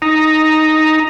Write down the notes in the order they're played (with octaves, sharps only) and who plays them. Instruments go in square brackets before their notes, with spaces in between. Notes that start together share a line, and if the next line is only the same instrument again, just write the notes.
[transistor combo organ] D#4 A#5